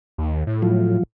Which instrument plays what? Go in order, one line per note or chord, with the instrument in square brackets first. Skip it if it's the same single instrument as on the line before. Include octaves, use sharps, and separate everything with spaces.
[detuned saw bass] D#2
A2
[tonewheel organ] F3 F#3 F4